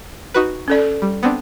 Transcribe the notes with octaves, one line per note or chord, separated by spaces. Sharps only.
D#4 F#4 B4
C#4 A4 D5
G3
B3 C4 D4